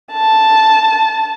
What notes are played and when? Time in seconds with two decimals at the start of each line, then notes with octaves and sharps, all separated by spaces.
0.13 A5